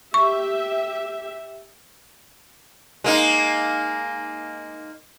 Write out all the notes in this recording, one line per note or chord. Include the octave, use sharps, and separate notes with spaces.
G4 E5 C#6
G#3 A#3 D#4